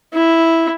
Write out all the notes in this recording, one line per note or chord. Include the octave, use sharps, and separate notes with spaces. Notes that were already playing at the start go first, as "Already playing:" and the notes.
E4